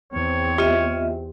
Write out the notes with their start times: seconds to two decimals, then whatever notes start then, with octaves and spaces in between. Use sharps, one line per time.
0.13 E2 C4 C#5
0.58 F4 G4 D#5 E5